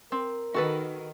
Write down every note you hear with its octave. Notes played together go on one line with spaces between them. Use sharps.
C4 A#4
D#3 F#4 A4 B4